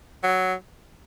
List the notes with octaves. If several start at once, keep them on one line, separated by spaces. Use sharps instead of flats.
F#3